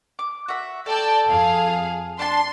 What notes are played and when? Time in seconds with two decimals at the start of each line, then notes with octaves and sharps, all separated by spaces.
0.19 D6
0.48 F#4 E5
0.86 A4 D5 G5 A5
1.28 F2 G#4 F5
2.19 D4 D5 A5 C6